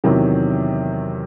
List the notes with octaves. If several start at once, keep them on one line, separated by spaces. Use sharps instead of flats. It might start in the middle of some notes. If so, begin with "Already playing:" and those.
E2 C3 D#3 F#3